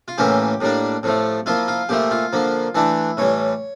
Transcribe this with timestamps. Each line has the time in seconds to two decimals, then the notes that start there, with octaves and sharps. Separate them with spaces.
0.08 F4
0.18 A2 E3 A#3 C#4 E4 G4
0.61 A2 G3 A#3 D4
1.03 A2 F3 A3
1.46 F3 A#3 E4 F4
1.68 F4
1.89 A#2 F3 A3 E4 G4
2.11 F4
2.33 D3 F3 A#3
2.75 E3 A3 D4 E4
3.17 A2 E3 G3 C#5